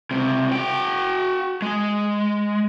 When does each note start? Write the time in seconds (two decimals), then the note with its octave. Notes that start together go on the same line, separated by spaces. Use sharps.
0.11 C#2 C3
0.52 F#4 G5
1.62 G#3